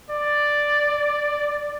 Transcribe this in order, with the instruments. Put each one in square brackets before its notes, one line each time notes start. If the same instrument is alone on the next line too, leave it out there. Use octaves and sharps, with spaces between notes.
[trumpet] D5